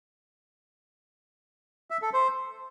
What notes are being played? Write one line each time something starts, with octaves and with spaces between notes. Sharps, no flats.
E5
A4
C5